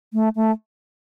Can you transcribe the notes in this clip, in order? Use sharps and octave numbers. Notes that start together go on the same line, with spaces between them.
A3
A3